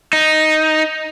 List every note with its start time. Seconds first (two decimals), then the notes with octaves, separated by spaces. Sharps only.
0.13 D#4